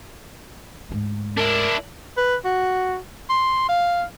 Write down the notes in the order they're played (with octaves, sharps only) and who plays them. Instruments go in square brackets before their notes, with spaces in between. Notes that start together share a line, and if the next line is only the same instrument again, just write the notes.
[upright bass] D2 G#2
[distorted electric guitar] D4 E4 [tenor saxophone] A#4
[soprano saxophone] B4
F#4
C6
F5